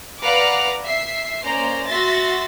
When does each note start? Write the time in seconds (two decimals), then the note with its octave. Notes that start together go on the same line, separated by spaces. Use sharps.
0.20 B4 D5 F5 F#5 A#5 D6
0.83 E5 C7
1.44 A#3 C#4 C5 D5 A#5
1.85 F#4 E5 C6 A6 A#6